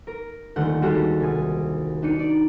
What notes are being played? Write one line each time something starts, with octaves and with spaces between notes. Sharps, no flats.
A#4
D#1 D3 A3 F#5 G6
G3 G#3 F#4 G4 A4
C2 G#5 D#6
D4 D#4 C#7 D#7
D5